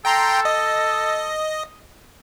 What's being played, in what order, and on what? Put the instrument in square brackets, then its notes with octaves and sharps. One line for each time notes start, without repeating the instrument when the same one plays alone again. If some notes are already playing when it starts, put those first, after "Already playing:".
[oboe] A4 [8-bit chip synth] G5 A#5 C6
[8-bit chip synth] D#5